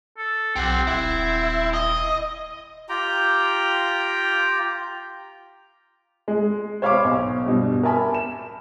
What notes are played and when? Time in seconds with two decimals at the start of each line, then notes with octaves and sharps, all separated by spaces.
0.18 A4
0.56 B1 C4 G4 F#5
0.87 D#1 E4
1.74 D#5
2.89 F4 G4 G5 A#5
6.28 G#3
6.82 C5 C#5 F5 B5 C#6 D6
7.04 B1
7.46 G2 B2
7.83 A#4 E5 G#5 A5 B5
8.14 E7